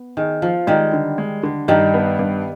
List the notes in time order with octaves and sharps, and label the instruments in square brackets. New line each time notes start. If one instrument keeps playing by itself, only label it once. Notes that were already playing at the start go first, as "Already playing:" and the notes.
Already playing: [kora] B3
[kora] D#3 [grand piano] G#4
[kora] F3 [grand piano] F4
[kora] D#3 G3 [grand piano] G#3
[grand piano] D3
G#3
D3
[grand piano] G2 [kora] D#3 G3
[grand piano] B3
G2